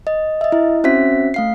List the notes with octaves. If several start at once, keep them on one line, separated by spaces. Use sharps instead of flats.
D#5
D#5 E5
E4
C4 C#4 F#4 C5 E5 B6
A3 F5 C7